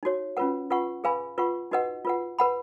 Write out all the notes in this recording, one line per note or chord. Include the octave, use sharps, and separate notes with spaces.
D#4 F#4 C#5
C#4 F4 B4 F#5
F4 B4 F#5 C#6
G#4 B4 F5 G#5 B5
F4 B4 F#5 C#6
D#4 F#4 B4 D#5 F#5
F4 B4 F#5
B4 F#5 B5